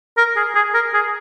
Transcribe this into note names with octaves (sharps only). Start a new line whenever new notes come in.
A#4
G#4
G#4
A#4
G#4